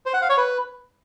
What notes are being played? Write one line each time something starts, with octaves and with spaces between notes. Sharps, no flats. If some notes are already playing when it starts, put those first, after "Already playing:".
C5
F#5
F5
C#5
B4